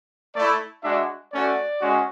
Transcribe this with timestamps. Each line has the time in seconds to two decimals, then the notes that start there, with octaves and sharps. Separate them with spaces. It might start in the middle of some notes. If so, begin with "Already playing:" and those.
0.34 A3 E4 D5
0.83 G#3 D4 F#4 E5
1.31 A3 C#4 F#4 D5
1.80 G#3 C#4 F#4